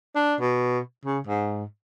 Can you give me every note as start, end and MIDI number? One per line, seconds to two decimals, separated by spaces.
0.15 0.35 62
0.40 0.80 47
1.05 1.19 49
1.27 1.64 44